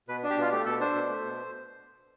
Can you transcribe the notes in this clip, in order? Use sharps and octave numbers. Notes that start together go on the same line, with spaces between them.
B2 B4
D4
G4
B2 F4
A3 G4
B2 A4
D4 C5
B2
A3
B2